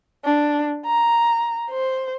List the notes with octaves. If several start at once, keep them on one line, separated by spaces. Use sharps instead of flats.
D4
A#5
C5